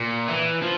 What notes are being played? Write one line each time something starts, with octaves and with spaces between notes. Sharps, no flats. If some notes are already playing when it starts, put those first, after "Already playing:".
Already playing: A#2
E3
F3